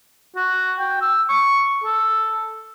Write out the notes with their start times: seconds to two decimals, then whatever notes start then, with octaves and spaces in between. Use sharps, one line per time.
0.36 F#4
0.79 G5
1.01 E6
1.29 C#6
1.84 A4